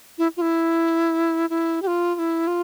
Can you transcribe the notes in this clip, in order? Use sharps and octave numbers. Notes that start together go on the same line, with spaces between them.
E4
F4
E4
E4
G4
F4
F4
E4
F4